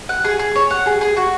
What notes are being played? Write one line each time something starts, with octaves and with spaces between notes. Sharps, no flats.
F#5
G#4
G#4
C#5
F#5
G#4
G#4
F#4